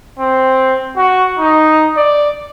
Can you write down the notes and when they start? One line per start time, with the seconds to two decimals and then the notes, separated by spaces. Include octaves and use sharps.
0.19 C4
0.97 F#4
1.39 D#4
1.96 D5